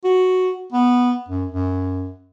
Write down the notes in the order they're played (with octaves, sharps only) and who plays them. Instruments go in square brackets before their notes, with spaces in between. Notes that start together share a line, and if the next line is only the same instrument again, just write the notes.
[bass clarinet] F#4
B3
F#2
F#2